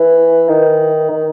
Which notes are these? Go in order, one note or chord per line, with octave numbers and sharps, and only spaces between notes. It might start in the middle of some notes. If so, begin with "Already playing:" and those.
Already playing: E3
D#3
D#3